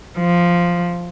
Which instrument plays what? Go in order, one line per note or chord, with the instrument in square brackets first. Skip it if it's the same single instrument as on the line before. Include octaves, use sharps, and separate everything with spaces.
[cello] F3